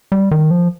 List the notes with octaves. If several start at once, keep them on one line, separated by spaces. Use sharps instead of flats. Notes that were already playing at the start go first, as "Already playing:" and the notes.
G3
D#3
F3